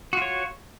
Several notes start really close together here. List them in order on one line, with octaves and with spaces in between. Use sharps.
F#4 F4 C#5